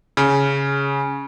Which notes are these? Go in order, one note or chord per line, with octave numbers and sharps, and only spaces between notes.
C#3